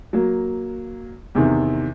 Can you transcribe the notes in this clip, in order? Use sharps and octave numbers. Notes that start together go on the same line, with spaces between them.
F#3 A#3
E2 C3 D#3